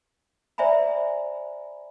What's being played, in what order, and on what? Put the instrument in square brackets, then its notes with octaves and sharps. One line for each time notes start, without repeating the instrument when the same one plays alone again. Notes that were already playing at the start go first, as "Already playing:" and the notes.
[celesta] C5 D5 E5 G#5 A#5 B5